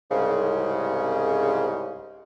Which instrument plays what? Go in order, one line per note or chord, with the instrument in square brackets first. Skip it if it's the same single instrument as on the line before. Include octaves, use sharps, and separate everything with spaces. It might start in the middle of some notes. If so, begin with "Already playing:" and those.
[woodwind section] C2 G#2 C#3